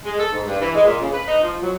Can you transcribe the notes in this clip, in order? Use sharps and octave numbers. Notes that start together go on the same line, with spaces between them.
G#3
A4
G#2
G2
E3
G#3
A#2
C#3
B4
D#4
F3
F#3